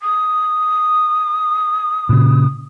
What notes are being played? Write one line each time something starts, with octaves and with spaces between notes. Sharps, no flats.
D#6
A#2 C#3